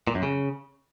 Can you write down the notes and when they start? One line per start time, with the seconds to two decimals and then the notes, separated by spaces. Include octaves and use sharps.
0.07 A#2
0.15 F#2
0.23 C#3